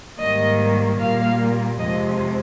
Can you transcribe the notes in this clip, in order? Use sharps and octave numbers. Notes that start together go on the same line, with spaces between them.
G#2 D#3 G3 A#3 D#5
A#2 G3 A#3 F5
F2 C3 F3 G#3 D#5